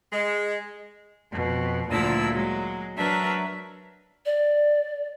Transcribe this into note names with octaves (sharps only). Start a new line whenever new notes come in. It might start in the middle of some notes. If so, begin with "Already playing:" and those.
G#3
F2 B2
D2 A#2 D3 F3 E4 E6
F#3 G#3
F#3 D4 A#4 B4 E5
D5